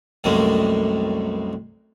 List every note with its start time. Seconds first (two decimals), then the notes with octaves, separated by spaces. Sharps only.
0.24 C2 F#2 A2 G3 G#3 A#3